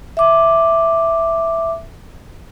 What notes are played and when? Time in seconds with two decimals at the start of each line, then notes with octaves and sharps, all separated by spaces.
0.17 E5 D6